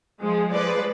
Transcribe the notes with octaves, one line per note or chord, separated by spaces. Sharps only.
F3 G#3
F3 G#3 B4 D5